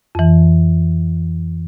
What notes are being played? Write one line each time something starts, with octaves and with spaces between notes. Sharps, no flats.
F2 E3